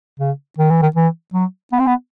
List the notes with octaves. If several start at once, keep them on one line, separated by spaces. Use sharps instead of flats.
C#3
D#3
E3
D#3
E3
F#3
B3
C4
B3